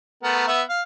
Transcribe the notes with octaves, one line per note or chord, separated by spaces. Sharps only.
A3 B3 A#4
B3 E5
F5